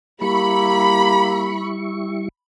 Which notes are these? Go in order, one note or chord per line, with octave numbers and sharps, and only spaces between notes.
G3 A#3 E4 G4 B5 C#6